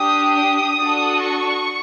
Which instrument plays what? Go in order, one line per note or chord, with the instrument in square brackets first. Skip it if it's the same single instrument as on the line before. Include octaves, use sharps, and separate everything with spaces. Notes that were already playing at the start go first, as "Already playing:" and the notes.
Already playing: [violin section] D4 G4 D#6
D#6
D4 F#4 A4
C#6